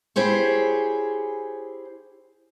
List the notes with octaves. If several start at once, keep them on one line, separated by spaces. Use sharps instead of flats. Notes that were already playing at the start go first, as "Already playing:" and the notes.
E4 G4 G#4 C5 C#5